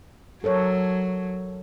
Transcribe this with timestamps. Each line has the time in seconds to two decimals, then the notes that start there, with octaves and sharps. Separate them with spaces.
0.44 F#3 A4 A#4 C#5